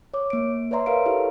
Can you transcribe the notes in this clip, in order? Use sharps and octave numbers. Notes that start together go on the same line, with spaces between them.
C#5 D6
A#3 D7
B4 C#5 D5 E5 A#5 C6
A#4 B4 F5 D7
E4 G4 A4 B4 C#5